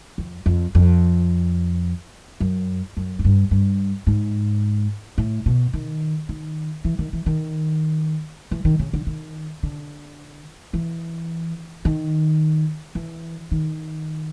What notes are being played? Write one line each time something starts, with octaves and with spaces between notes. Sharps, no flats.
F2
F2
F2
F#2
F#2
G#2
G2
G2
G#2
A2
B2
D#3
D#3
E3
D#3
E3
D#3
E3
D#3
C#3
D3
D#3
D3
E3
D#3
E3
D#3